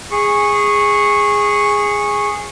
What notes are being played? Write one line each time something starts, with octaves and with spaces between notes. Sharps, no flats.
G#4 C#6